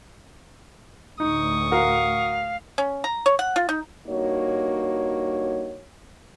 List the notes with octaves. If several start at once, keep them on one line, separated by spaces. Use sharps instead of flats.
D2 A2 D#4 C#6 D#6
F#4 A#4 F5
C#4
A#5
C#5
F#5
F4
D#4
G2 A#3 D#4 F#4 C#5